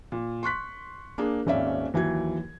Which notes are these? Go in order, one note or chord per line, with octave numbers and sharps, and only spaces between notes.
A#2
C6 C#6 F#6 B6
A#3 D4 G#4
D#1 G#1 C#4 D5 E5 F5
D#2 E3 F#3 G#6